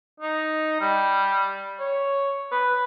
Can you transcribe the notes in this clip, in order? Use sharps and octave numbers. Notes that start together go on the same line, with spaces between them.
D#4
G3
C#5
B4